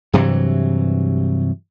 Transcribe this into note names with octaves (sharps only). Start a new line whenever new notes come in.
G2 C3 E3 F#3